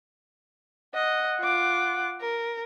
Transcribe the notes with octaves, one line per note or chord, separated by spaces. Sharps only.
D#5 F#5
F4 D6
A#4